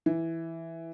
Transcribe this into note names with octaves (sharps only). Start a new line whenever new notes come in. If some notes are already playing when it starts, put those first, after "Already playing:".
E3